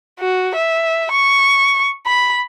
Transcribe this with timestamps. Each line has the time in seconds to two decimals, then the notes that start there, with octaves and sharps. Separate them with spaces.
0.20 F#4
0.55 E5
1.12 C#6
2.06 B5